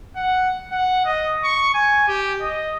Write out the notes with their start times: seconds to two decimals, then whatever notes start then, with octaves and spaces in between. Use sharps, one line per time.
0.15 F#5
0.71 F#5
1.05 D#5
1.44 C#6
1.74 G#5
2.08 G4
2.41 D#5